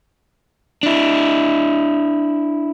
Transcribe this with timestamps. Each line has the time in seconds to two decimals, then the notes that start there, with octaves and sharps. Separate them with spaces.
0.83 D4 E4